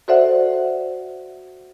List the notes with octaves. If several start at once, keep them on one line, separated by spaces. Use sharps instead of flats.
F#4 A4 C5 D5 E5 F#5